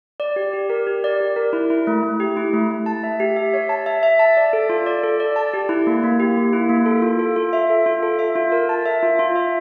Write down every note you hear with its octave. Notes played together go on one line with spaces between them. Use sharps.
D5
G4
G4
A#4
G4
D5
G4
A#4
E4
E4
A3
A3
G4
E4
A3
A3
A5
E5
G4
E5
C#5
A5
E5
E5
A5
D5
A4
F4
D5
A4
D5
A5
G4
E4
A#3
A#3
G4
A#3
E4
A#3
A4
F4
A4
F4
E5
A4
F4
A4
E5
F4
A#4
A5
E5
F4
F4
E5